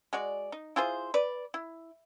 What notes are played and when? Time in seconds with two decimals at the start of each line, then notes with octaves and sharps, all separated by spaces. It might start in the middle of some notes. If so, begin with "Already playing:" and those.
0.13 G#3 F#4 D5
0.52 D#4
0.76 E4 F4 G#4 C5
1.14 B4 D5
1.54 E4